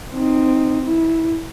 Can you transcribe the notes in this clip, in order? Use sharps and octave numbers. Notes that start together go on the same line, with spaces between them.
C4 D#4
E4